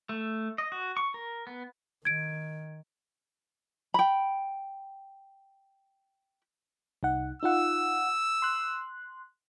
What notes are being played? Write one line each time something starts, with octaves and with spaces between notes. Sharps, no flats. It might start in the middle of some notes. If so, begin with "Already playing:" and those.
A3
D#5
F#4
C#6
A#4
B3
D#3 G#6 D7
G5 B5
C2 D#4 F#5
D#4 F4 F#5 E6
C6 F#6